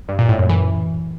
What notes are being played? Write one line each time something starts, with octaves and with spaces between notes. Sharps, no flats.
G2
A#2
A2
F#2
E3